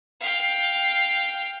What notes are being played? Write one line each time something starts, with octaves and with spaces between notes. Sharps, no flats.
F5 G5